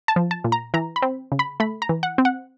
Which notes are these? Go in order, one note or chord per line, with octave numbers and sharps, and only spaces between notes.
A5
F3
A5
A#2
A#5
E3 A#5
B5
C4
C#3
B5
A3 B5
A#5
E3
F#5
C4
F#5